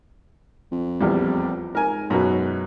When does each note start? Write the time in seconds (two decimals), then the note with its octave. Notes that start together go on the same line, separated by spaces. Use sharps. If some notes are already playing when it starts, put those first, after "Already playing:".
0.72 F2
1.00 A#1 E2 G3
1.75 G#2 A#4 G#5
2.10 F#2 B2 F#3